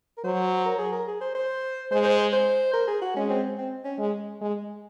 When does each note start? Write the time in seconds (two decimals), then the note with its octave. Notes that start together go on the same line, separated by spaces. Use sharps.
0.17 A#4
0.24 F#3 C5
0.66 A#4
0.78 G#4
0.92 A#4
1.07 G#4
1.21 C5
1.35 C5
1.91 G#3 C5
2.05 C5
2.32 C5
2.74 A#4
2.87 G#4
3.02 F#4
3.16 G#3 C#4
3.30 C4
3.58 C4
3.85 C#4
3.98 G#3
4.41 G#3